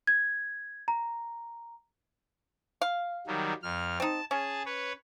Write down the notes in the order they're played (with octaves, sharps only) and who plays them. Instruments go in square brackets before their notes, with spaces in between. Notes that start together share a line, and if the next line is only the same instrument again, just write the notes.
[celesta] G#6
A#5
[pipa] F5
[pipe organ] D#3 F#3 G3
F2 F6
[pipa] C4 D#4 [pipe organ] A5
[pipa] C#4 [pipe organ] G#4 A5
[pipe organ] B4 C#5